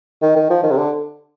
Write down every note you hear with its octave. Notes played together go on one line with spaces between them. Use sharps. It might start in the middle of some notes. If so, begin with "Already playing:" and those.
D#3
D#3
F3
D#3
C3
D3